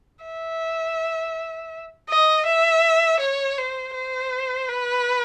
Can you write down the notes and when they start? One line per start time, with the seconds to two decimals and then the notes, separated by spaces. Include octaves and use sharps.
0.25 E5
2.09 D#5
2.46 E5
3.20 C#5
3.57 C5
3.94 C5
4.68 B4